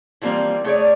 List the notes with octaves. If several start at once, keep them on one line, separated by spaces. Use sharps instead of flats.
E3 F3 G3 A#3 C4
A3 G#4 C#5 D5